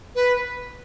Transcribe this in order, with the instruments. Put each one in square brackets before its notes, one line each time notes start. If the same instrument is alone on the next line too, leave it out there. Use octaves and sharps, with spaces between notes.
[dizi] B4